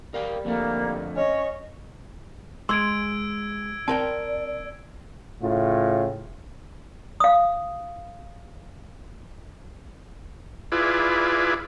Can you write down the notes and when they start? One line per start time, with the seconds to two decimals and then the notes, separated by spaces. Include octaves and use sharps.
0.14 G3 A#4 F5 G5
0.45 F2 D3 A3 A#3
1.16 C#4 C#5 D#5
2.69 G#3 C6 E6 G#6 D7
3.88 C4 A#4 D5 G5 A5
5.42 A2 C#3 A3 F4
7.20 F5 D#6
10.72 E4 F4 G#4 B4 D5